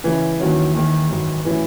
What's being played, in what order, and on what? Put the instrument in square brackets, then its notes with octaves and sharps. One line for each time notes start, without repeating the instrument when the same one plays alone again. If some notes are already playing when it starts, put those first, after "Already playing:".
[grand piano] C#3 G#3 C#4 [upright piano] E3
[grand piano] D#2 D#3 F#3 C#4 F#4
D#2 D#3 G#3
G#2 D#3 F#3
[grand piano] A2 F#3 C#4 [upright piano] E3